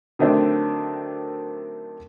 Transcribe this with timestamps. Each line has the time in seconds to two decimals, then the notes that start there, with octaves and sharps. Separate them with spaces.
0.19 D3 D#3 F#3 A3 C4 D4